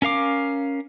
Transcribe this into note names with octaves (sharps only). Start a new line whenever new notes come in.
C#4 A#4 F5 D6